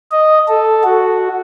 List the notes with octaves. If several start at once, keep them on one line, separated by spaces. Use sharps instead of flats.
D#5
A4
F#4